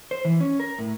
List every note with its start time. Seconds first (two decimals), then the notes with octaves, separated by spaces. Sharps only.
0.11 C5
0.25 E3
0.40 C#4
0.60 A#4
0.78 A2